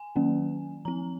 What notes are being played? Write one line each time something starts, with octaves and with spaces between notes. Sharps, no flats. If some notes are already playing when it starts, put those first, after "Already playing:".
Already playing: G#5
D#3 F#3 A#3 C#4
F3 C4 A#5